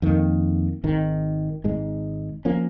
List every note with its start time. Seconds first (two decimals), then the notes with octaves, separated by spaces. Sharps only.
0.02 F2 D#3 A#3
0.84 G#1 G#2 D#3
1.64 G#1 G#2 G#3
2.45 F3 A#3 C#4